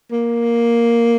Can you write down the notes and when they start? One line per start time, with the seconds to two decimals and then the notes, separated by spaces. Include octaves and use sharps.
0.12 A#3